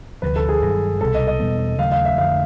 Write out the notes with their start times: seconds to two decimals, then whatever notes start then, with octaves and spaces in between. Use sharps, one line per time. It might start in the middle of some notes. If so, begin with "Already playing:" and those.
0.22 D2 C3 F3 B4
0.36 A4
0.49 G#4
0.62 G2 D#3 F#3
1.01 C2 B2 G3 A4
1.14 D#5
1.27 D#5
1.40 E2 B2 G3 B3
1.79 D#2 C#3 F#3 A3 F5
1.92 F5
2.05 E5
2.18 F2 D3 F3 A3 F5